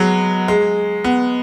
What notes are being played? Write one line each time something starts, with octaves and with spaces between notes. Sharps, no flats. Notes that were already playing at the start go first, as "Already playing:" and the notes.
Already playing: F#3 G#3 B3
G#3
B3